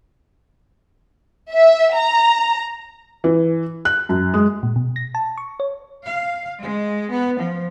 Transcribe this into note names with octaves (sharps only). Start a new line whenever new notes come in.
E5
A#5
E3
F#6
F#2
G#3
A#2
B2
A#6
A5
C#6
C#5
F5
G#3
B3
F3